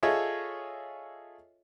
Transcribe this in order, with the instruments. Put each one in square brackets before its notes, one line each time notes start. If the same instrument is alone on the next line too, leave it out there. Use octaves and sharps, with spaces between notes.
[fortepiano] F4 G#4 A4 C#5 D#5 E5